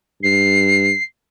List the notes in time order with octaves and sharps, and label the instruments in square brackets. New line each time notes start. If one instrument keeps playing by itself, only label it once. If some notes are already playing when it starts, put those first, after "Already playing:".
[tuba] G2 [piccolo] C7